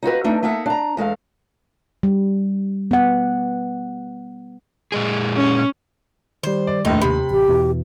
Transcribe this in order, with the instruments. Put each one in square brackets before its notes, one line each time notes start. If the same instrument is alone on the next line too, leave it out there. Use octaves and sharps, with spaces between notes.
[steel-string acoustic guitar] D#4 F4 F#4 B4
A3 D4 D#4
A3 A#3 D#4 E5 F#5
D4 A#5
E2 G#3 A4 F5
[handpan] G3
B3 F#5
[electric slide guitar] A#2 G#3 G#4
[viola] C#4
[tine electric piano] D#3 G3 [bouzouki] C5
[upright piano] D5
[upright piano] F1 A#1 A2 [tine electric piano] D#2 [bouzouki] D#4
[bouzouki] C3 [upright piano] B5
[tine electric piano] A1 [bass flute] G4
[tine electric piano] E2 B2 E3